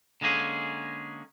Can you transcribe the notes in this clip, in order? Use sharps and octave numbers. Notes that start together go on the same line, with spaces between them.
D3 G#3 A#3 C#4 G#4